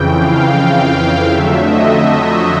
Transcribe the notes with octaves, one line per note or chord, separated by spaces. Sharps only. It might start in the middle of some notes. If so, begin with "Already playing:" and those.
Already playing: F2 C#3 E3 G5
F5
F2 D3 F#3 A3 E5
D#5